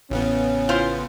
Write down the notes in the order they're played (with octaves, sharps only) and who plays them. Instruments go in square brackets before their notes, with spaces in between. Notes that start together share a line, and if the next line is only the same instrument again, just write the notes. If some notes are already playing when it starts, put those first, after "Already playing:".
[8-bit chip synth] A1 C#3 B3 [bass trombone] C#4
[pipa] E4 F4 C5